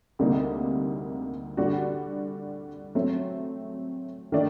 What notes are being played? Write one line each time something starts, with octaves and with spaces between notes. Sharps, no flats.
D2 C3 G3 A#3 D#4
D3 G3 D4 F#4
F#3 A3 C4
D#3 A3 D4